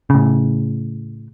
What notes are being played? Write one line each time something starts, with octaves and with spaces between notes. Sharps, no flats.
A2 C#3